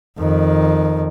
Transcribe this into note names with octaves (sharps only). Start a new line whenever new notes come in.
F2 D#3